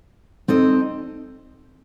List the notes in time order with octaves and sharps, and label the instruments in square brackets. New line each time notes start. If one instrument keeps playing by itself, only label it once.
[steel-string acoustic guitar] C4 D#4 A4 D#5